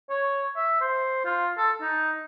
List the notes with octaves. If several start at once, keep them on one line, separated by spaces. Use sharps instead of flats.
C#5
E5
C5
F4
A4
D#4